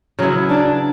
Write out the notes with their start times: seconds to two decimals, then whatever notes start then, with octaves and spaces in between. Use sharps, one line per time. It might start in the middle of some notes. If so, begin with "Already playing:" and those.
0.19 C#3 F#3 B3 E4
0.49 D4